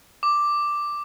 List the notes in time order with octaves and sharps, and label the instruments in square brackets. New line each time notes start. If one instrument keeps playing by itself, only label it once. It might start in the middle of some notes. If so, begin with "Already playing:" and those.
[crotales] D6